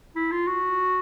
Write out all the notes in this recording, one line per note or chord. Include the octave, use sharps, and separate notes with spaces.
E4
F4
F#4